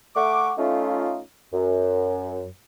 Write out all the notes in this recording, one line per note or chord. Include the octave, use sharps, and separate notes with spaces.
A3 F#5 C#6 D6
A3 C#4 D#4 F4
F#2